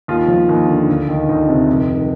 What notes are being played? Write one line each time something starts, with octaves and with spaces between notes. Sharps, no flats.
D#2 F4
F3
D#2
D3
D2
D#3
D2 D#4
C3
F1
D#3